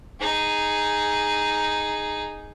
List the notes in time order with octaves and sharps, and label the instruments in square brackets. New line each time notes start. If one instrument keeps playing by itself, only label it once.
[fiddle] D#4 G#4